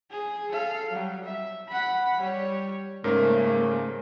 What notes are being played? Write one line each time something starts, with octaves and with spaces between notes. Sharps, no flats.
G#4
A4 F5
F#3 G3
E5
F#5 B5
G3 C#5
G#2 C#3 G3 A3 A#3 C#4 A#4 C5